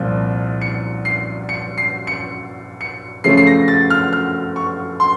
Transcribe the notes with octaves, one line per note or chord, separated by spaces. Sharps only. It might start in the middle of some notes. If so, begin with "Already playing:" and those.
Already playing: C2 A#2 F3 C4
C#7
C7
C#7
C7
C#7
C#7
C#3 F3 A3 C#4 C7
C7
A#6
A6
F6
F6
C#6
C6